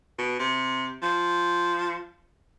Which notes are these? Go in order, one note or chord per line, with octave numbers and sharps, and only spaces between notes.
B2
C3
F3